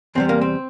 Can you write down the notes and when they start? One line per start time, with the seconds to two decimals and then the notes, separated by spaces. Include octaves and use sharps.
0.15 E2 C3 G3 C4
0.29 A#3
0.41 C4